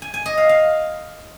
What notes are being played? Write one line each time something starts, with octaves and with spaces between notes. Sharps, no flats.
G#5
G#5
D#5
F5
F5